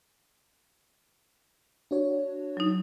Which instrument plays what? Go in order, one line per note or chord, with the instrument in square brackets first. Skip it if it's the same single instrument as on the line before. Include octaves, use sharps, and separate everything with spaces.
[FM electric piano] D4 F#4 C#5
[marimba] F#3 D#4